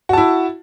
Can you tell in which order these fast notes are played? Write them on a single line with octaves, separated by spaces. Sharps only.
F#4 A5 E4